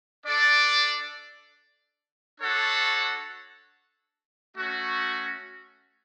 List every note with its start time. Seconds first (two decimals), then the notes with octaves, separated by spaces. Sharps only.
0.25 D4 A4 D5
2.41 D4 F#4 A4 C#5 F#5
4.56 A3 C#4 F#4